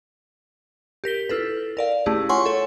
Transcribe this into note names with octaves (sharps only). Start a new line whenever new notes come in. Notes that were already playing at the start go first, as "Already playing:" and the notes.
G4 A#4 B6 G7
E4 F4 A4 B4
A#4 D5 F5
A3 C#4 E4 G4 G#4
F4 C#5 F#5 G#5 C6 C#6
A4 C#5